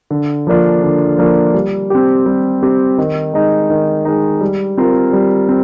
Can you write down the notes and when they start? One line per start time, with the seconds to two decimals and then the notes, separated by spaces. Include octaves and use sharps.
0.10 D3
0.47 F3 A#3 D4 F4
0.82 D3
1.18 F3 A#3 D4 F4
1.54 G3
1.90 C4 G4
2.26 G3
2.63 C4 G4
2.98 D#3
3.33 G#3 D#4
3.70 D#3
4.05 G#3 D#4
4.41 G3
4.77 C4 F4 A#4
5.13 G3
5.49 C4